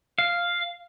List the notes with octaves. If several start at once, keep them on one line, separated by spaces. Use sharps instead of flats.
F5